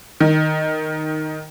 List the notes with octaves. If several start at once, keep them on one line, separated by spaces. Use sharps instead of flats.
D#3